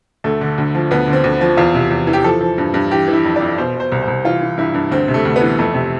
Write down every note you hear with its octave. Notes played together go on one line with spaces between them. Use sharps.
D2 A3
D3
D2
F3
D2 B3
D3
C4
D2
F3
E2 F4
C3
E2
E3
G4
F3 A4
F3
G2
G2
E3 G4
E3
E4
F2
F2 D5
B2 C5
B2 C5
C2
C5
C2
E3 F4
E3
G2 E4
G2
D2 C4
C3
A3
D2
B3
E3
F2 A3
C3